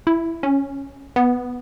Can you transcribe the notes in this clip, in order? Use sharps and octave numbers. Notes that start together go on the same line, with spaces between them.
E4
C#4
B3